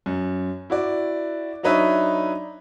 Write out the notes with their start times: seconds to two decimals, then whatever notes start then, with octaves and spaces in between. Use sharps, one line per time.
0.06 F#2
0.70 E4 F#4 D5
1.63 F#3 D4 D#4 B4 C#5 E5